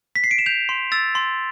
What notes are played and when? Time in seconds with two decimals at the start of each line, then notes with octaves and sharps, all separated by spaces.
0.15 B6
0.24 C7
0.31 D7
0.39 E7
0.46 G6 F7
0.69 C6
0.92 E6 A6
1.15 C6